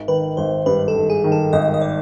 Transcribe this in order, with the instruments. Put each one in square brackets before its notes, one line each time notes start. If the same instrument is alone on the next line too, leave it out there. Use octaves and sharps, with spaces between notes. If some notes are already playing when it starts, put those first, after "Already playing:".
Already playing: [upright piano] G#1
[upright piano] D#3 [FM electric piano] B4
[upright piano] G#1 [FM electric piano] C5
[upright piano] G2 [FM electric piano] B4
[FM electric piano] A4
[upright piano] G#1
[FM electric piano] G#4
[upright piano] D#3
[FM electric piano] A4
[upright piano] G#1 [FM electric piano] D#5
[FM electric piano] D#5
D5